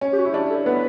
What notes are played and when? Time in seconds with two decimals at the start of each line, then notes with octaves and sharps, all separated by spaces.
0.01 C#4
0.13 G4
0.18 F#4
0.25 E4
0.33 D4 G4
0.50 A4
0.66 B3 B4